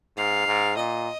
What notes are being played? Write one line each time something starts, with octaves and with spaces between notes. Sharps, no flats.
G#2 F5
G#2
A#2 D#5